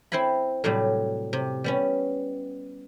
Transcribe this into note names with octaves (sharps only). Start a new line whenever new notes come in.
C4 E4 C5 G#5 B5
A2 C3 F#3 G3
C3
G3 B3 C#4